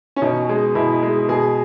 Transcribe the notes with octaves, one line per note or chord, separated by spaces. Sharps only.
C#4
B2 D#4
G#3
B2 E4
G#3
B2 G#4